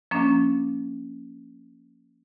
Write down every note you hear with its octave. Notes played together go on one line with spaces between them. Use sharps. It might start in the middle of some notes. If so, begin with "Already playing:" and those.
F3 A#3 C#4 D4